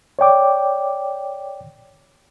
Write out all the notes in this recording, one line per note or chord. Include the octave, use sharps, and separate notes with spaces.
C#5 D5 G5 D6